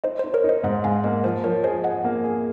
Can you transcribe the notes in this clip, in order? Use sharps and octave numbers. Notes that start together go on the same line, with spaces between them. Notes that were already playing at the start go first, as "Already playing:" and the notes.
D#4 C5 D#5
D#4 C5
A#4 C#5
D#4
C5 D#5
G#2 D#5 F#5
G#2 F5 G#5
A#3 D#5 F#5
F3 C5
F3 A#4 C#5
G#4 C5 D#5
G#4 D#5 F#5
A#3
G#4